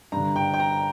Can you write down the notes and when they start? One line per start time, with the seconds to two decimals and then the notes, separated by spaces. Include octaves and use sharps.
0.12 G2 D3 A#5
0.36 G5
0.53 G5
0.60 A#5